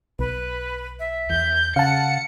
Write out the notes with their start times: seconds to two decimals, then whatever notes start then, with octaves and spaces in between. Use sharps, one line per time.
0.19 B1 B4
0.99 E5
1.30 E2 G6
1.76 C#3 F5 F#5 A5 C#7